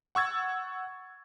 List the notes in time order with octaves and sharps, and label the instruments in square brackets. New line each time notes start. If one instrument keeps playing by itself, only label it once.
[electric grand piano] F#5 C#6 E6 G#6 A6